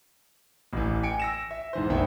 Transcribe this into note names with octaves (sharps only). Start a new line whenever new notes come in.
A1 E3
G5 G#5 C#7 D7
E6 A#6 E7
E5
G#2 E3 C5
F1 A#1 D#3 B3 E4 G5